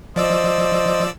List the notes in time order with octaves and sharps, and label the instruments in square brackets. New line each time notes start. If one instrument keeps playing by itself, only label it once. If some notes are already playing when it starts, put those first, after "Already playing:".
[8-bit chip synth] F3 D5 E6 [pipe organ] C5 D#5